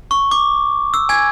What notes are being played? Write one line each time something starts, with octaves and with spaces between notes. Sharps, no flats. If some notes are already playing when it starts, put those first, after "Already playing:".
C#6
D6
E6
G#5 G#6